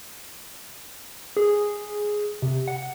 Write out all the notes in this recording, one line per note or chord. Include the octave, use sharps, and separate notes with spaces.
G#4
C3
F#5